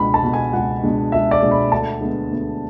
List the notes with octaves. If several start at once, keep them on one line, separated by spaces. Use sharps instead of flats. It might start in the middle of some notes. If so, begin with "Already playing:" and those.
Already playing: C#2 B2 G#3 D4 B5
A5
B2 G#3 D4
G#5
C#2 F#5
B2 G#3 D4
C#2 E5
D5
B2 G#3 D4
B5
D2 A5
D3 G#3 B3
D2